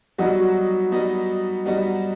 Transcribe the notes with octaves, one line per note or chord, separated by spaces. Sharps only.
F#3 G3 B3 D#4 F#4
G3 B3 D#4 F#4
G3 B3 D#4 F#4